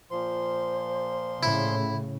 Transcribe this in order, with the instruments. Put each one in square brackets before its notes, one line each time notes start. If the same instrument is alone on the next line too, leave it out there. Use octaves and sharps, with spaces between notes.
[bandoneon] A#2 F3 C6 [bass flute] C5
[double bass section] A2 C#3 [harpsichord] E4